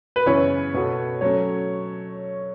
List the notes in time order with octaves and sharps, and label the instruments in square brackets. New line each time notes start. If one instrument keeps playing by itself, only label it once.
[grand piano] B4
[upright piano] F#2 C#3 E3 B3 E4 [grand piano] C#5
[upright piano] B2 B3 F#4 A4
[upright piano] F#3 A3 C#4 [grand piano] C#5